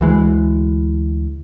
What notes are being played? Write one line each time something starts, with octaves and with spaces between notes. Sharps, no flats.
D2 E3 G#3